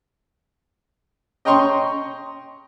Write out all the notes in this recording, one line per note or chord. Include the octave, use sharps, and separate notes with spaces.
D#5 G5 A#5 C6 C#6